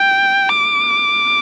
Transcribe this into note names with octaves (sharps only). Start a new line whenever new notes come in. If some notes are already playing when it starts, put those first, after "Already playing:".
Already playing: G5
D6